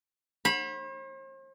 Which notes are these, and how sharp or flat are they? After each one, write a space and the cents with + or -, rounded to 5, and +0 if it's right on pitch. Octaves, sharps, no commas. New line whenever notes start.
C5 +45 B5 -10